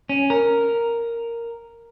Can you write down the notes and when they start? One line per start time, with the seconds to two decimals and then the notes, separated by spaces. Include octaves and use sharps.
0.09 C#4
0.30 A#4